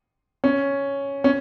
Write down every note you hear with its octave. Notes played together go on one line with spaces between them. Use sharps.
C#4
C#4